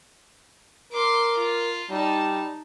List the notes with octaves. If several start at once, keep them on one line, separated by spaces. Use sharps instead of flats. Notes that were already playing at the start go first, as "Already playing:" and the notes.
A#4 C6 D6
F4
G3 D#4 A5